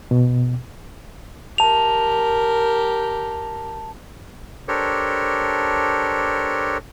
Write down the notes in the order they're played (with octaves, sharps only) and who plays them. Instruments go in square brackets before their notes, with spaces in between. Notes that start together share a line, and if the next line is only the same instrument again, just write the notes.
[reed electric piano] B2
[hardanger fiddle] G4 A#4 [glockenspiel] A5 F7
[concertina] D4 G4 A4 A#4 C5 C#5